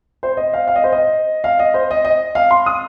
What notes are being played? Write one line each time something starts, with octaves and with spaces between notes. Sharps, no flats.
C5
D#5
F5
F5
D#5
C5
D#5
F5
D#5
C5
D#5
D#5
F5
C6
D#6